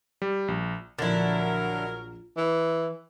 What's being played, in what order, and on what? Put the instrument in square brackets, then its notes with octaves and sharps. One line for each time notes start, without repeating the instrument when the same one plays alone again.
[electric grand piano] G3
A#1
[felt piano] A#1 A6 [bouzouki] D3 E4 [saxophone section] F#3 A#4
[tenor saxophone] E3